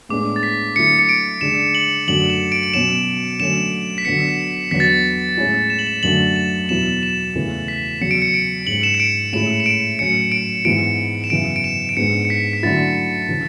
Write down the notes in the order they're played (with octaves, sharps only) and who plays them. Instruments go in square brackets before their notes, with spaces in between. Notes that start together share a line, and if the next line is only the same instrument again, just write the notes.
[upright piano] A2 G#3 B3 D4 [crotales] D6
[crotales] A6
B6
[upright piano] D3 F#3 A3 E4 [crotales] C#7
[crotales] C#7
D7
[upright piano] C#3 G#3 D4 [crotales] E7
[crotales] F#7
[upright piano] F#2 D3 F#3 A3 [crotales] F#7
[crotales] E7
D7
D7
[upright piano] B2 F#3 C#4 [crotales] E7
[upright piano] D3 F#3 A3 C#4 [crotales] E7
[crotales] B6
[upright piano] D3 F#3 B3 [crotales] C#7
[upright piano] E2 D3 F#3 B3 [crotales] B6
[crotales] A6
B6
[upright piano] A2 G#3 C#4 E4
[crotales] E7
F#7
E7
[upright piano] F#2 D3 A3 D4 [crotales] F#7
[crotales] E7
[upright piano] E2 B2 F#3 B3 E4 [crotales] E7
[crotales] E7
[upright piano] E2 C#3 E3 A3
[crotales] B6
[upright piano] E2 C#3 F#3 [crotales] C#7
[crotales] D7
C#7
D7
[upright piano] G#2 G#3 C#4 [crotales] F#7
[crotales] E7
C#7
D7
[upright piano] A2 G#3 C#4 E4 [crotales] E7
[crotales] E7
D7
[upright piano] A2 F#3 C#4 [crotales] C#7
[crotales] D7
[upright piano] G#2 E3 B3 E4 [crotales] D7
[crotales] E7
[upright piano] F#2 C#3 E3 B3 [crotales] D7
[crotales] D7
E7
D7
[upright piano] G#2 G#3 B3 D4 [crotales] C#7
[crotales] C#7
B6
B6
[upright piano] D3 F#3 A3 C#4 E4 [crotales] A6
[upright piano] C#3 E3